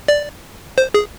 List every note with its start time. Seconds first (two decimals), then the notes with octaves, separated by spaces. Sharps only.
0.08 D5
0.78 C5
0.94 G#4